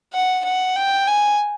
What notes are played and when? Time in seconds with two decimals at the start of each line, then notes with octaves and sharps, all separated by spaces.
0.13 F#5
0.45 F#5
0.76 G5
1.08 G#5